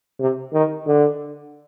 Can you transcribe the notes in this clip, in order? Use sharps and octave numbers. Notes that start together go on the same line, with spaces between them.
C3
D#3
D3